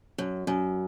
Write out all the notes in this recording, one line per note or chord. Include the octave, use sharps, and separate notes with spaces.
F#2
F#2